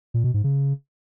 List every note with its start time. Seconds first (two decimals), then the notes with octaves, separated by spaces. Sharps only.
0.14 A#2
0.24 B2
0.34 G#2
0.44 C#3